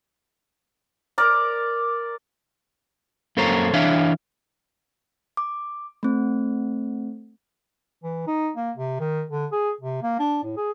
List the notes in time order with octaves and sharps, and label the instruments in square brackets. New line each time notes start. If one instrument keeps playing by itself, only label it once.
[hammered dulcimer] A#4 D5 A#5
[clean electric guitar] F#2 A#3 A4 C5 C#5 A#5
E3 D4 C#5 E5 F5
[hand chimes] D6
A3 C4
[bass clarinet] E3
D#4
A#3
C3
D#3
D3
G#4
C3
A#3
D4
A2
G#4